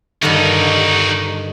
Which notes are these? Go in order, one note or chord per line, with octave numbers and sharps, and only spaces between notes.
G2 D3 D#3 D#4 F#4